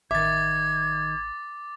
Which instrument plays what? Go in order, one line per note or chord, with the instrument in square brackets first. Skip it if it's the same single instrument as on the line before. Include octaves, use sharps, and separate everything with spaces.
[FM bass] A1 [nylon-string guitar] D#3 E5 [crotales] D6 A6 [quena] G#6